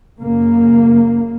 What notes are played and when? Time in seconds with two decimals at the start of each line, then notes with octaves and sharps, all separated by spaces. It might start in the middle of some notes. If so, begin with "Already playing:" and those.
0.20 F#2 C#3 A#3